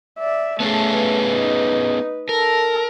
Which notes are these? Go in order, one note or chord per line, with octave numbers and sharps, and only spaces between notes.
D5 E5
A3 B3 C#4 G#4 A5
B4
D#4
A4 A#4